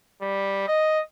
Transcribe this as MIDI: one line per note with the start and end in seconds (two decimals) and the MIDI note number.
0.21 0.63 55
0.68 1.00 75